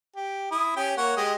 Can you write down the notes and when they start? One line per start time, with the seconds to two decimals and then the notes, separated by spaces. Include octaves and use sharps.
0.16 G4
0.51 E4 D#6
0.76 C#4 G4 G5
0.97 A#3 C#5 F#5
1.17 G#3 G4 D#5